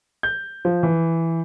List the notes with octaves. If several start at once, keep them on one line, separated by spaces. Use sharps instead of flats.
G6
F3
E3